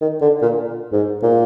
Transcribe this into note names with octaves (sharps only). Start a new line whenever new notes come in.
D#3
D3
A#2
G#2
A#2